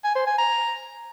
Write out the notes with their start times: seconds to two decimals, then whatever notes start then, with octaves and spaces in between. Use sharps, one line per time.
0.04 G#5
0.15 C5
0.27 G#5
0.38 A#5